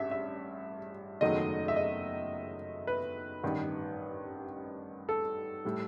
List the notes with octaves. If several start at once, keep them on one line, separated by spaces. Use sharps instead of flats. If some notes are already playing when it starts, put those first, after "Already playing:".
Already playing: A1 G2 E5
E5
F#1 E2 D#3 F#3 A3 D#5
E5
D#5
B4
A1 G2 D#3
A4
A2 G3